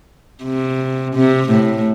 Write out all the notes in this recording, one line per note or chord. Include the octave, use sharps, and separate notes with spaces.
C3
C3
A2